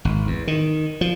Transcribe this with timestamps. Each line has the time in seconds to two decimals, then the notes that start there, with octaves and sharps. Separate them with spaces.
0.05 G#1
0.27 E2
0.47 D#3
1.01 F3